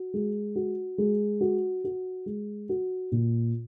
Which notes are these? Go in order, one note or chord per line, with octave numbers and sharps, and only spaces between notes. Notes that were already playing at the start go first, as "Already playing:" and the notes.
Already playing: F#4
G#3
F#4
G#3
F#4
F#4
G#3
F#4
A#2